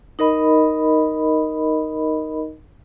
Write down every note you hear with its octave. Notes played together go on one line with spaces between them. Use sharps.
D#4 A#4 D#5 B5